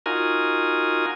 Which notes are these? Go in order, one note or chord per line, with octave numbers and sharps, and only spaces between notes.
D#4 F4 F#4 A#4 G#5